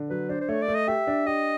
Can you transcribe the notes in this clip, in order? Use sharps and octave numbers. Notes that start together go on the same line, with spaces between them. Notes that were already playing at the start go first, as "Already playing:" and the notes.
Already playing: D3
F#3 B4
D4 C5
C5
A3 C#5
D5
A3
D#5
G4 E5
D4
G4 D#5